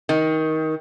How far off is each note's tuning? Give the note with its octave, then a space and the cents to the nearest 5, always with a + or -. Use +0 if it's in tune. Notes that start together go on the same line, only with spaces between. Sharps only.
D#3 +20